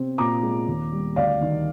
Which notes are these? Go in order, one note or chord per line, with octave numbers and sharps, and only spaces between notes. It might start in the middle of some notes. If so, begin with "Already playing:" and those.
Already playing: C3 C4
A#2 A#5 D6
G#3
D#2
G3
D2 D5 F5
D#3